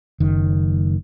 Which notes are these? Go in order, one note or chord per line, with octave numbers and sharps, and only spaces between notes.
F#1 D#3